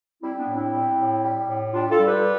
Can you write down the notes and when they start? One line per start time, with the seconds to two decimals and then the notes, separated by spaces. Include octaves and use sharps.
0.22 G3 C4 E4
0.39 B3 D4
0.47 A2
0.56 C4 E4
0.73 G3
0.98 A2
1.23 G3
1.49 A2
1.73 G3 D4 F4
1.90 F4 A4
1.99 G3
2.07 G4 B4